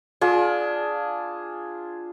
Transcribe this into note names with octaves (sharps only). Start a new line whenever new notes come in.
D4 F4 G#4